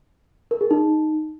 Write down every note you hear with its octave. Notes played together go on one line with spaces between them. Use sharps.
A#4
G#4
D#4